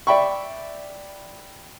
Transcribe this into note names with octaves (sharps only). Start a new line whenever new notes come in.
D5 E5 G5 B5 C#6